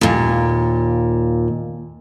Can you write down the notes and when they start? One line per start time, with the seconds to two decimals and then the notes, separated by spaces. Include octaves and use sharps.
0.01 D#2 A#2